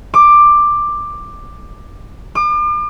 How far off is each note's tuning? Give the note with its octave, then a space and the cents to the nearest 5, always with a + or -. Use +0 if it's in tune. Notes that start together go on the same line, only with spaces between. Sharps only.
D6 +10
D6 +40